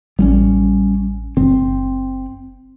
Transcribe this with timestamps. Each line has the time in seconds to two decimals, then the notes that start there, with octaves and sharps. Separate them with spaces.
0.19 A1 G3 B3 C#4
1.37 F#1 C4